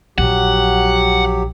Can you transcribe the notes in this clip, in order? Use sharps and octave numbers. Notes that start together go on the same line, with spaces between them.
A#1 F#3 G4 F#5